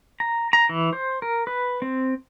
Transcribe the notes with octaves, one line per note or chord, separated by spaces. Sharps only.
A#5
A#5
E3
C5
A#4
B4
C4